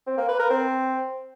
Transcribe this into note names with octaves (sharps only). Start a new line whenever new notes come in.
C4
A#3
B4
A#4
C4